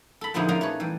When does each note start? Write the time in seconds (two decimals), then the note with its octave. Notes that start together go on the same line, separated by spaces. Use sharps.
0.21 A4 B5
0.34 A#2 D3 F3 D#4 E4 G#4
0.49 C#4 D#4 G#4 A#4 D5 F5
0.61 A3 B4 C#5
0.80 E3 G3